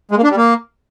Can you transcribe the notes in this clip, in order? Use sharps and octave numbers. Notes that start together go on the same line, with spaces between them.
G#3
A#3
D4
G3
A#3